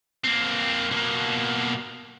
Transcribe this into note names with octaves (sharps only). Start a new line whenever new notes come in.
A#3 C4
B2 A#3